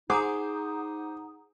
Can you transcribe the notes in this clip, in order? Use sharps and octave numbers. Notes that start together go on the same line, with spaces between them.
D#4 G#4 C5 F#5 A#5 D6 D#6